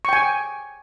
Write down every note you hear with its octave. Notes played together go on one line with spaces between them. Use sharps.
G5 G#5 C#6